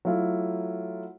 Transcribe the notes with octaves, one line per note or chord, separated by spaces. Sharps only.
F#3 A3 E4 F4